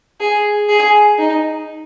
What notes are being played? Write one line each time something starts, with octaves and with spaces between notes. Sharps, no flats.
G#4
G#4
D#4